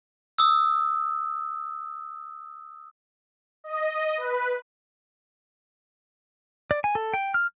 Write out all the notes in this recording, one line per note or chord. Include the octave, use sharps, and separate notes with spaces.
D#6 E6
D#5
B4
D5
G#5
A4
G5
F6